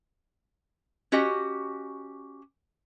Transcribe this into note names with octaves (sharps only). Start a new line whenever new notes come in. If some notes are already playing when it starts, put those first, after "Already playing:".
C#4 F#4 G4 D#5